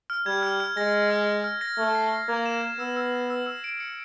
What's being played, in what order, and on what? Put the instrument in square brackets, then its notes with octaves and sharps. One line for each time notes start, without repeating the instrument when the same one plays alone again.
[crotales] F6
[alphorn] G3 [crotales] G#6
[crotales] F6
F6
[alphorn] G#3 [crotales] A#6
[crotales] A#6
F6
F6
F6
A#6
[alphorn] A3 [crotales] G#6
[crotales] C7
C7
[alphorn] A#3 [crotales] G#6
[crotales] E7
E7
[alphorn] B3 [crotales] E6
[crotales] E6
E6
E6
E6
D7
C#7